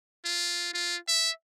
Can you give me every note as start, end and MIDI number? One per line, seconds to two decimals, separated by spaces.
0.25 0.72 65
0.74 0.97 65
1.08 1.31 76